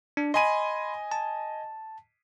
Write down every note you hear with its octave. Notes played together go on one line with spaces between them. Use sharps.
D4
D#5 G#5 B5 C6 D#7
A5